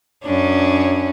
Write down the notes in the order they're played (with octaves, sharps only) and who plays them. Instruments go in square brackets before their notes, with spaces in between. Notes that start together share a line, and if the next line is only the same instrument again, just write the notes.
[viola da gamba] F#2 C#4 D4